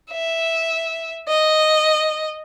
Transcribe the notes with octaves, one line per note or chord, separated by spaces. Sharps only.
E5
D#5